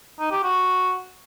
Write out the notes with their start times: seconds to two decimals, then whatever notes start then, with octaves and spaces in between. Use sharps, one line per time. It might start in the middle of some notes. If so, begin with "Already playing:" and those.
0.20 D#4
0.32 G4
0.43 F#4